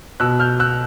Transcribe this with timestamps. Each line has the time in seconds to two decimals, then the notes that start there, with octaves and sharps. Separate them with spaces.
0.20 B2 E6 F#6
0.40 F6 G6
0.60 E6 F#6